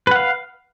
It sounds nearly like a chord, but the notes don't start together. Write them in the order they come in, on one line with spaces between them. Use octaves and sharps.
B4 F#5 F5